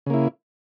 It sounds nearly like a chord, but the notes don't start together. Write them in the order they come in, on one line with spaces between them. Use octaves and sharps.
C#3 A#3 E4